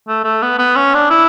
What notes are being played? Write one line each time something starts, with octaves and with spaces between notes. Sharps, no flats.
A3
A3
B3
B3
C#4
D4
E4